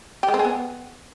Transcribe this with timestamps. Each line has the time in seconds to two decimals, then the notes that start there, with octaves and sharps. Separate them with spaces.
0.23 G4
0.28 G#3
0.34 C4
0.39 G#4
0.45 B3